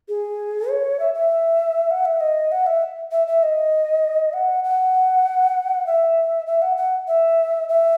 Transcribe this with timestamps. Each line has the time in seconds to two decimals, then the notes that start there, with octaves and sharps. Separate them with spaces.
0.09 G#4
0.69 C#5
0.99 E5
1.14 E5
1.91 F#5
2.05 E5
2.20 D#5
2.52 F#5
2.66 E5
3.12 E5
3.27 E5
3.43 D#5
4.33 F#5
4.64 F#5
5.86 E5
6.46 E5
6.62 F#5
6.77 F#5
7.08 E5
7.69 E5